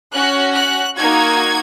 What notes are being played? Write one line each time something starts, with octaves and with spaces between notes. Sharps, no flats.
C#4 F#4 F#6
F#6
A#3 D#4 F#4 G#6